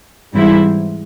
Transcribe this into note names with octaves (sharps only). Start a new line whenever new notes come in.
G#2 E3 G3 C4 E4